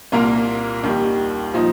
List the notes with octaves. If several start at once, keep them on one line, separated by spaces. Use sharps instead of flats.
C2 A#2 A#3 F4 A#4
D#2 D#3 G3
A#2 F3 D#4